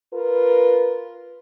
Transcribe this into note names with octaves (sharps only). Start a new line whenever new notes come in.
F4 A#4 B4